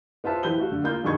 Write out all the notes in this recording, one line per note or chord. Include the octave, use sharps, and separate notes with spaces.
B3 F4 C5 E5 A5
E3 G4 G6 G7
A3 F#4 F5
D3
A#3 F4 G6
G2 B2 D#3 G#4 C#6 G#6